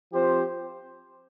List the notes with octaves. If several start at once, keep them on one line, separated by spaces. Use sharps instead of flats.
F3 C4 G4 C5